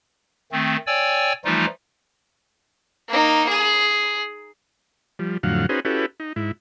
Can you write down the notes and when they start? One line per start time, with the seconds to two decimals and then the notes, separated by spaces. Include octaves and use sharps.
0.52 D#3 A3 C4
0.87 C#5 D5 G5 G#5 E6
1.45 E3 F3 G3 A3 D#4 F4
3.09 A#3 D#4
3.49 G#4
5.19 F3 G3
5.43 F2 A2 D3 F#3 F5 F#5
5.69 C#4 D#4 F#4 G#4 B4 C5
5.85 C#4 E4 F#4 G4 A4 B4
6.20 D#4
6.36 G#2 E4